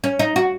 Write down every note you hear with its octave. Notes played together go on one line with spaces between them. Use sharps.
C#4
D#4
F#4